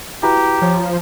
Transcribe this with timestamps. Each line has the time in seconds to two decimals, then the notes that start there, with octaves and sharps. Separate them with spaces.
0.23 E4 F#4 G4 B4 A#5
0.62 F3 C#5